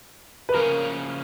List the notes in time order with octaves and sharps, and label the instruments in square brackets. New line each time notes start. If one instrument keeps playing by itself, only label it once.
[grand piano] B4
[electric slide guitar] C#3 F3 A#3 C#4 [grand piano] A#4